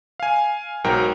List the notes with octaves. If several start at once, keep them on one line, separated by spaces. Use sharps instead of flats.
F5 G#5
B1 G#2 F#3 A#4 G5 A#5